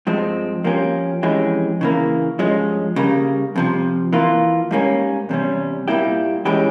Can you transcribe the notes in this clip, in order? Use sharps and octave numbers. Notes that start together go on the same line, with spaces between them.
G2 F3 G#3 C4
F3 A#3 C#4 G4
F2 E3 G#3 C#4 G4
C#3 E3 A#3
G2 F3 G#3 C#4
C#3 G3 A#3
F2 C3 F3
E3 A#3 F4
G#2 G3 A#3 C#4
E2 C3 G3 C#4
A#2 G3 A#3 E4 G4
E3 G#3 C#4 G4